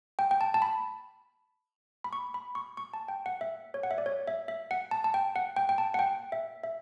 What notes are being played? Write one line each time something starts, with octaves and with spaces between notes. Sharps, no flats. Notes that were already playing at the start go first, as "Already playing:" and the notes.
G5
G5
A5
A5
B5
B5
C#6
B5
C#6
C#6
A5
G5
F#5
E5
C#5
F#5
E5
D5
C#5
E5
E5
F#5
A5
A5
G5
F#5
G5
G5
A5
F#5
G5
E5
E5